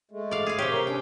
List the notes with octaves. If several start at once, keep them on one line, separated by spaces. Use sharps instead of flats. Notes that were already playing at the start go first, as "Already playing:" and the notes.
G#3 A3
D5 F5
G#4 F5
C3 G4 C#5
A#4
C#4 D4 G5